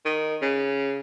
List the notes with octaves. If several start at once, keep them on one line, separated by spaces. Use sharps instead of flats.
D#3
C#3